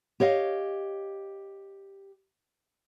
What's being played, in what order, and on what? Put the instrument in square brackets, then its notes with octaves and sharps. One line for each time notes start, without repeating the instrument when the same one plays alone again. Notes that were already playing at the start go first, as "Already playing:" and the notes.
[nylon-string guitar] G4 C#5 D#5 F5